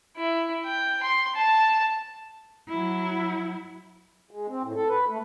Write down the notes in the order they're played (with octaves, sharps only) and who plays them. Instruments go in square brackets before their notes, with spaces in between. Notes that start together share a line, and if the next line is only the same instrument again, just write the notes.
[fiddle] E4
G5
C6
A5
[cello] F#3 E4
[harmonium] G#3
C4
A2
A4
B4
A3